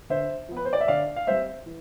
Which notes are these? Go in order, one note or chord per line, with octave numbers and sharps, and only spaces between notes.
D3 C5 E5
F3 B3
B4
C5
D5
E5
D3 D5 F5
F5
G3 C4 C5 E5
E3